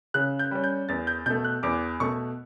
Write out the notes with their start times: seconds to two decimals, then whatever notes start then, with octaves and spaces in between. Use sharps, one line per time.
0.14 C#3 F#6
0.39 G6
0.51 G3 C#4
0.64 G6
0.89 E2 A6
1.07 G6
1.26 B2 G6
1.30 A3
1.44 F#6
1.63 E2 D6
2.00 B2 A3 C#6